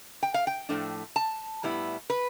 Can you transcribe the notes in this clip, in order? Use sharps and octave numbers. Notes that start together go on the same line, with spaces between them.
G5
F5
G5
A2 F3 A3 D4
A5
A2 G3 B3 E4
B4